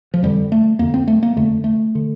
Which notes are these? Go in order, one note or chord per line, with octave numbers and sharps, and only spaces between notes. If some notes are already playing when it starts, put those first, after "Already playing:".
F3
F2 D3 G3
A3
F2 D3 A#3
C4
A3
A#3
F2 D3 A3
A3
D3